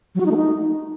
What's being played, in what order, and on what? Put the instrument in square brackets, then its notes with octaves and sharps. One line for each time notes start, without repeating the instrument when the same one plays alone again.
[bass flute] F#3
F#4
D#4
A3
D#4